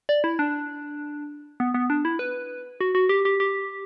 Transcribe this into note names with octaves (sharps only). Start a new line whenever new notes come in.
D5
E4
D4
B3
B3
D4
E4
B4
F#4
F#4
G4
G4
G4